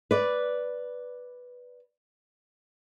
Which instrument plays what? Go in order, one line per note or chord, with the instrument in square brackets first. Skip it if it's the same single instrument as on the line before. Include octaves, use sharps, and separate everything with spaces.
[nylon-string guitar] B4 D5